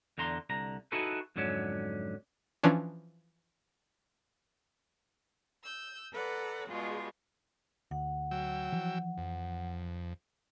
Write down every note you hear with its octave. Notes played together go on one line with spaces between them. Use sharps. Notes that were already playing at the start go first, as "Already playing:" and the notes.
E2 D3 A#5 C6
C2 D3 A#5
D#4 E4 F#4 G#4 A4 B4
F2 G#2 D3 F#3 C#4
E3 F3 C#4 D4
E6 G6
A4 B4 D5 F#5 A#5
B2 G3 G#3 F4 G#4
D2 F#5
F#3 G5 E6
E3 F3
F2